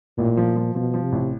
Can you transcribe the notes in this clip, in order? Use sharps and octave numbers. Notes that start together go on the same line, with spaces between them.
A1 A#2
F3
F3
B2 F3
F3
C3
A1